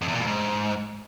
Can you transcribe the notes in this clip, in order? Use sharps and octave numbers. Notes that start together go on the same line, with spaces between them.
F2
E2
A#2
G2
G#2